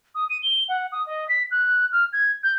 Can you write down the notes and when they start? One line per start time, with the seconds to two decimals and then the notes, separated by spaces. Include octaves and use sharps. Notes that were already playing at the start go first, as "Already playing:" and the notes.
0.15 D#6
0.29 D#7
0.43 G7
0.68 F#5
0.92 D#6
1.06 D#5
1.28 B6
1.51 F#6
1.92 F6
2.13 G#6
2.43 G6